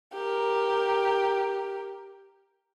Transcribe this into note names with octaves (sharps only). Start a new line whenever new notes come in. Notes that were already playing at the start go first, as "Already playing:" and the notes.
G4 A#4